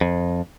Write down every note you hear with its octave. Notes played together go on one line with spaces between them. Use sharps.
F2